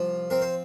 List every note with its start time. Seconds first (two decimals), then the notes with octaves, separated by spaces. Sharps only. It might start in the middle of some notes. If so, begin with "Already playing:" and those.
Already playing: C2 F3
0.30 C4 A#4
0.42 C5